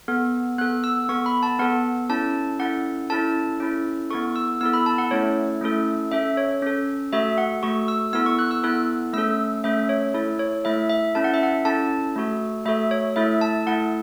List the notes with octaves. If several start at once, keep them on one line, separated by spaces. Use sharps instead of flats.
B3 A4
B3 A4 F#6
E6
B3 A4 C#6
B5
A5
B3 A4 F#5
C#4 E4 A4 A5
C#4 E4 A4 F#5
C#4 E4 A4 A5
C#4 E4 A4
B3 E4 A4 C#6
E6
B3 E4 A4 E6
B5
A5
F#5
A3 C#4 E4 A4 C#5
A3 C#4 E4 A4
C#4 A4 E5
C#5
C#4 A4
A3 F#4 A4 E5
F#5
A3 F#4 A4 C#6
E6
B3 E4 A4 E6
C#6
F#6
E6
B3 E4 A4 F#6
A3 C#4 A4 E6
A3 C#4 A4 E5
C#5
A3 E4 A4
C#5
A3 E4 A4 E5
E5
C#4 E4 A4 A5
F#5
E5
F#5
C#4 E4 A4 A5
A3 F#4 A4
A3 F#4 A4 E5
C#5
A3 E4 A4 E5
A5
A3 E4 A4 F#5